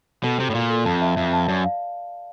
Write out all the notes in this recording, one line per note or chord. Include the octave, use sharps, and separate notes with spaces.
B2 A4
C3 F#4
A2
A#2 F5
A4
F2 A5
E5
F2 E5
A5
F#2 D5
F5